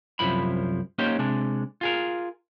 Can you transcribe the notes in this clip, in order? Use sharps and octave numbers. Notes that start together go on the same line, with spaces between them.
C2 F#2 F3 E4 B5
A#3 C#4 D#4 G4 C5
C3 G#3 D4
F4 G#4 A#4